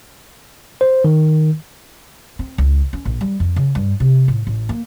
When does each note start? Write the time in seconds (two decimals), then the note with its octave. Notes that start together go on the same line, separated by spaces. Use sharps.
0.81 C5
1.04 D#3
2.39 C4
2.58 C#2
2.93 C#4
3.05 A#1
3.21 G3
3.40 F2
3.56 C#3
3.75 G2
4.00 C3
4.28 A2
4.47 A1
4.69 A#3